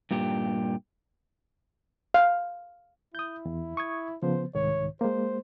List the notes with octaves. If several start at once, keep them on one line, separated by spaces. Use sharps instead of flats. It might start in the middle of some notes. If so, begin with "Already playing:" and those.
G2 A#2 G4
F5
E4 D#6 G6
E2
C#6 D#6 G#6
C#3 F3 B3 C5
C2 G#2 D#3 C#5
G#3 A#3 C5